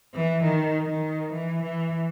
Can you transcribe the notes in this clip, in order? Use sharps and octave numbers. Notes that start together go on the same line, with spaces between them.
E3
D#3
D#3
E3
E3